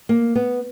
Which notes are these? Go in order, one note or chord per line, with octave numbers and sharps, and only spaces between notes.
A#3
B3